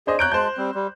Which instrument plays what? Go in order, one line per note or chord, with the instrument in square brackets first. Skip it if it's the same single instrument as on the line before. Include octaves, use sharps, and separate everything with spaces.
[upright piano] D4 C5 D#5 [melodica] G#4
[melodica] C#5 A#5 [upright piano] F#6 G6 D7
[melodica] G#3 A5 [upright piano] C5 G6
[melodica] G3 C4
G3